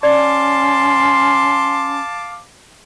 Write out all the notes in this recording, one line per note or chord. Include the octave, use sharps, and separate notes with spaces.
C#4 D5 F5 A5 C6 D6